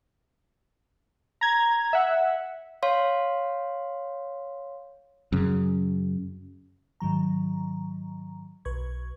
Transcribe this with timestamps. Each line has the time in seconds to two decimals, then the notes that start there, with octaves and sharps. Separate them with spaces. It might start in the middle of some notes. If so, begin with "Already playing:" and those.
1.41 A#5 G#6
1.93 E5 F#5
2.83 C#5 F5 C6
5.32 F#2 C#3
7.00 G#2 D#3 F#3 A#5
8.65 B1 B4 C#6 G#6